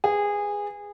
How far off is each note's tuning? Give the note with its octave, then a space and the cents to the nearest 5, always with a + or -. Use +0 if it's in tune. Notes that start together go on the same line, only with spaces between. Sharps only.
G#4 -20 B4 +5